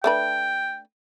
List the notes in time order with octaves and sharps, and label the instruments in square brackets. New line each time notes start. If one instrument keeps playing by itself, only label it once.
[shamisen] A3 D4 B4 [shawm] G5